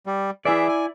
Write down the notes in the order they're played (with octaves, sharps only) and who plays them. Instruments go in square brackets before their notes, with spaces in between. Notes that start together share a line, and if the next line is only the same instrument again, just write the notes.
[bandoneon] G3
[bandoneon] E3 G#4 E5 [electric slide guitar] E4 D5
[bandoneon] G#5